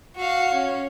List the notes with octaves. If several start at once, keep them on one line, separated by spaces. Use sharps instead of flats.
F#4 F5
C#4